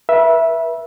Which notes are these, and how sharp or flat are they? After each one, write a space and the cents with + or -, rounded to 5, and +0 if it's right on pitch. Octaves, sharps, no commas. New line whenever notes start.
B4 -35 E5 +0